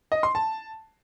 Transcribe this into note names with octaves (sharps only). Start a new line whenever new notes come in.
D#5
C6
A5